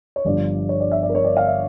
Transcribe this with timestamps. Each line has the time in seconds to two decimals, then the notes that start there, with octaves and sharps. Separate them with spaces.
0.16 C#5
0.25 G1 G2 F3 D5
0.69 C#5
0.80 D5
0.92 E5
1.03 D5
1.09 A#4
1.15 C#5
1.25 D5
1.37 F5
1.47 E5